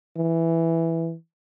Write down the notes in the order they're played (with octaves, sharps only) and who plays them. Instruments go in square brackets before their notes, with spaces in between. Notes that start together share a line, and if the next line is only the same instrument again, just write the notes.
[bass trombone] E3